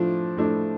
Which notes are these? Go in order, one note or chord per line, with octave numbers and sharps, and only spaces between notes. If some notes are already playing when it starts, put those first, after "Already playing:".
Already playing: A2 F3 A3 D4
A2 A3 D4